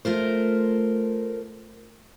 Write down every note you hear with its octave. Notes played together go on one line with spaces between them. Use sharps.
A3 F4 A#4 C5